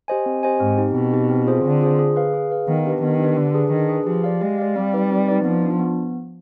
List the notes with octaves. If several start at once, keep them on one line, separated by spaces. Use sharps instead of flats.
G4 C5 D#5 G#5
C4
G4 C5 D#5 G#5
G#2 C4
D#4 G4
B2 C4
D#4 G4
C4
F4 G#4 C5
D3 C4
F4 G#4 C5
G#4
B4 F5
G#4
B4 F5
D#3 B3
D4 G4 B4
D#3 B3
D4 G4 B4
D3 D4
G#4 B4
D#3 D4
G#4 B4
F3 G4
D5 F5
G#3 G4
D5 F5
G3 C4
D#4 B4 D5
C4
D#4 B4 D5
F3 B3
D4 F4
B3